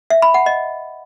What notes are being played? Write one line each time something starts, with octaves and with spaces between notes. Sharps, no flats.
E5
B5
F#5
D#5